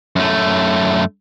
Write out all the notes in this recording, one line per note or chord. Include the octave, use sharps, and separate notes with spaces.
F#2 A3